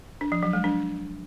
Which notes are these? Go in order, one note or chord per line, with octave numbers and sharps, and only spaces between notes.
D4
F3
F#3
G#3
D4